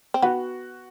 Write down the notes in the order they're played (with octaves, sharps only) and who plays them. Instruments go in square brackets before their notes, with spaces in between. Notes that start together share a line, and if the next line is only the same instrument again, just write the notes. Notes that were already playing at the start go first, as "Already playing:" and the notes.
[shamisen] C4
[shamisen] B3 [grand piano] F#4